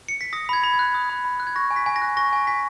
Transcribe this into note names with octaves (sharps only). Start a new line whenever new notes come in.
C#7
B6
D#6 A#6
B5 G#6
B5
G#6
F#6
D#6
B5
B5
F#6
G#6
C#6 A#6
G#5
B6
G#5
A#6
F#6
C#6 A#6
G#5
G#5 B6